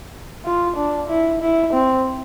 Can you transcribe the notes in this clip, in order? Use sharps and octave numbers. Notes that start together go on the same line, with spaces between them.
F4
D4
E4
E4
C4